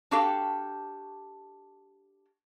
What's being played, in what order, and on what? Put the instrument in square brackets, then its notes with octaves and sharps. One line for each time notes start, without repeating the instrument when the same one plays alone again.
[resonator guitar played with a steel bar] D4 F#4 G4 A4 F5 G5